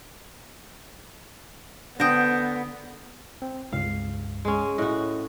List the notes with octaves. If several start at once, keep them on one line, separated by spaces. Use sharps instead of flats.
D3 B3 C4 G5 D#6 A#6
C4
C#2 G2 F5
G#3 C#4
A2 F#4 D#5